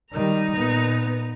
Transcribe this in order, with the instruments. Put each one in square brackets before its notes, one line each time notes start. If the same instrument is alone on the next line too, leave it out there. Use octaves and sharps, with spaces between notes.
[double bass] D#3 G3 [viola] D#4 A#5
[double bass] A#2 B3